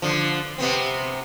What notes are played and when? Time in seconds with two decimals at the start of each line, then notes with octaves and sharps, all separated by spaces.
0.02 D3 F3
0.58 C3 B3 C4